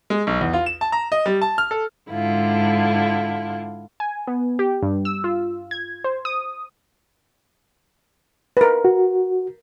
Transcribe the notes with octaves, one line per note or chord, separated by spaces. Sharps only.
G#3
B1
E2
F4
E7
A5
A#5
D#5
G3
A5
F6
A4
G#2 D3 E4 F4
G#5
B3
G4
G2
E6
F4
G#6
C5
D#6
A#4 B4
F#4